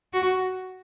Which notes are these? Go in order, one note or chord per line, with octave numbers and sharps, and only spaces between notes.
F#4